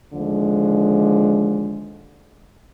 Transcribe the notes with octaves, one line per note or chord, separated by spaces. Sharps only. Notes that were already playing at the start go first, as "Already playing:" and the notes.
D#2 D3 F3 G#3